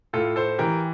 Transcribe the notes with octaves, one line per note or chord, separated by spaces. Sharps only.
A2 F4 A4
A4 C5
E3 G4 A#4